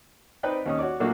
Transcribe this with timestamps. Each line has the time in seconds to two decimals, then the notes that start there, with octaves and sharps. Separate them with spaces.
0.43 C4 D#4 B4 D5 D#5 G5
0.66 D#2 C#4 D#6
0.79 F#4 C#5 D5 D6
1.00 A#2 F#3 A3 A#3 D4 F#4